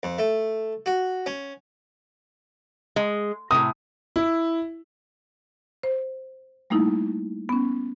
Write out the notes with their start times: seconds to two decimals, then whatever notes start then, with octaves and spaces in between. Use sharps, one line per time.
0.03 F2
0.18 A3
0.86 F#4
1.26 C#4
2.96 G#3
3.51 A2 C3 D#6
4.16 E4
5.83 C5
6.70 G3 A3 A#3 D#4 E4
7.49 B3 C#4